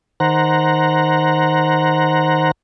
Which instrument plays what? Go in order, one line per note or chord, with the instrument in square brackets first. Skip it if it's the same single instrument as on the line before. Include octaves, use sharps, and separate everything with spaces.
[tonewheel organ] D#3 C5 F#5 A#5